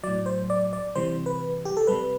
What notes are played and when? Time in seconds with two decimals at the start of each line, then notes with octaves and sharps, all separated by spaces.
0.04 A2 F#3 D5
0.26 C5
0.50 D5
0.73 D5
0.95 C3 E3 G3 C5
1.26 B4
1.65 G4
1.77 A4
1.87 C3 G3 B4